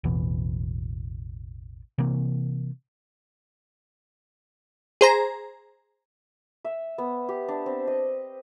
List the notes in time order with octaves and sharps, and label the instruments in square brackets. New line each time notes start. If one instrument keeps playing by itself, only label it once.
[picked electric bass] A1 E2 B2 E3
C3 E3 A#3
[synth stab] G#4 C5 A#5
[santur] E5
B3
G4
D4
C4
D#5